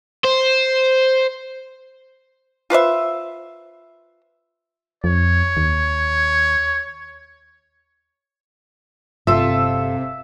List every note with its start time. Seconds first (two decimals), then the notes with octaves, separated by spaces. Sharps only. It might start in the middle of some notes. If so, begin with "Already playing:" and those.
0.25 C5
2.70 F4 B4 C5 E5
5.04 F2 C#5
5.57 D#2
9.27 G1 C3 F4 A4 E5